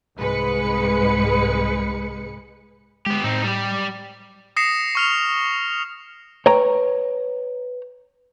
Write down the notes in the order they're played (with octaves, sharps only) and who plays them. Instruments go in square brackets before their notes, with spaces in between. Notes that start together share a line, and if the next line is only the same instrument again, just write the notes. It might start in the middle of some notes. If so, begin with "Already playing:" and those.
[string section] C2 G#2 G#3 B4 C#7
[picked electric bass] G#3 [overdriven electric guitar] B3 G4
[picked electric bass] A2 [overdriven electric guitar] C4 D#4
[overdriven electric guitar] G3 G4
[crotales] D#6 A#6 C7 C#7 E7
C#6 F6 F7
[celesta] B4 [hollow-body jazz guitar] C#5 G5 A#5